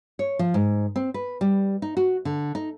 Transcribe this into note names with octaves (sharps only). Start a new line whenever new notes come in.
C#5
F3
G#2
C4
B4
G3
D#4
F#4
D3
D#4